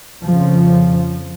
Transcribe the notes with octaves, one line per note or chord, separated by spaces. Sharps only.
F2 C#3 F3